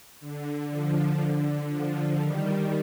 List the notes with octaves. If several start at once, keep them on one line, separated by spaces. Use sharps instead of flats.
D3
D3 F3
D3
D3 F3
D#3 G3